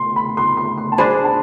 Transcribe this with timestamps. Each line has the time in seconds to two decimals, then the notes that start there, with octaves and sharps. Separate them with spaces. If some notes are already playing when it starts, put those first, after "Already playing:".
Already playing: C6
0.16 B5
0.37 C6
0.57 C6
0.78 C6
0.92 A5
0.98 D4 G#4 C5 B5
1.24 A5